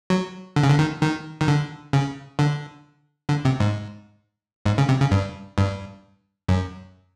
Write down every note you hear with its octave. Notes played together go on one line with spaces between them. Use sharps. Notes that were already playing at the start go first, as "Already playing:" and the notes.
F#3
D3
C#3
D3
D#3
D#3
D#3
D3
C#3
D3
D3
C3
G#2
G#2
C#3
C3
C#3
G2
G2
F#2